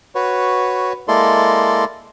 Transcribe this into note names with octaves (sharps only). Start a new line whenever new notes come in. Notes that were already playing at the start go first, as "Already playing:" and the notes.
F#4 B4 C#5
G#3 A#3 E4 A4 D5 C6